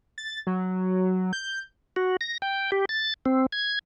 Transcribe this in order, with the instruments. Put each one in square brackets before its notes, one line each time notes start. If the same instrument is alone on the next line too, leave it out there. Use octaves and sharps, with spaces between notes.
[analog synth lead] A6
F#3
G6
[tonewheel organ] F#4
A#6
G5
G4
A6
C4
G#6